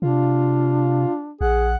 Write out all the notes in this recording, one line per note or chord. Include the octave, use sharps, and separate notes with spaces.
C3 D4 F4
A#1 G#4 F#5